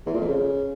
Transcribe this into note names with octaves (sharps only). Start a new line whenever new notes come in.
E2
A#2
F2
C#3